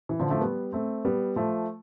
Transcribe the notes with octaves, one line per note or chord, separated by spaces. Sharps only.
E3
D3 F3
F3 A3
G3 B3
A3 C4
G3 B3
F3 A3